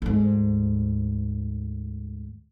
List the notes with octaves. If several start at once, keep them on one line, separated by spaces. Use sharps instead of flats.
D2 G#2